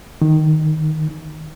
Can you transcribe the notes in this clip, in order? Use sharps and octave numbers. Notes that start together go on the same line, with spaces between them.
D#3